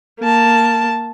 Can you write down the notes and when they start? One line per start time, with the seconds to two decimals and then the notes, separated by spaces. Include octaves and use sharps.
0.20 A#3 A5